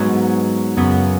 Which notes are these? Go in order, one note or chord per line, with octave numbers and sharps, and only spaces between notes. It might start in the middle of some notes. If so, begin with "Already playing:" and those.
Already playing: G#2 F#3 B3
F#2 C#3 F#3 B3